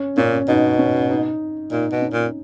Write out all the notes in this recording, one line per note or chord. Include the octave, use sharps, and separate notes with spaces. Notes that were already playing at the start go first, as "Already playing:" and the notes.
Already playing: C#4
A#2 C#4
B2 D#4
C#4
D#4
A#2 D#4
B2
C#4
A#2